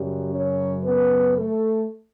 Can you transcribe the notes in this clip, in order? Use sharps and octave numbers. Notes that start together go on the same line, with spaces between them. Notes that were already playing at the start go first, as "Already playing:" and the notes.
Already playing: F#2 C#3 F#3 G3 G4
C#4 C#5
B3 B4
A3 A4